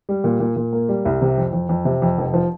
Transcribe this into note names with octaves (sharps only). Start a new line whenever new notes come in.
G3
A#2
A#2
A#2
A#3
G3
C2
C3
F2
F2
F2
C3
F2
F1
F3